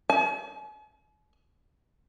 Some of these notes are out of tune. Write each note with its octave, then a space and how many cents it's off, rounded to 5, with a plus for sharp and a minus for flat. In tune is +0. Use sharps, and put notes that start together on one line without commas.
G#5 +45